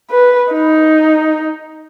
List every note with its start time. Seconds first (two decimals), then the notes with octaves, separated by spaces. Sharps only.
0.11 B4
0.52 D#4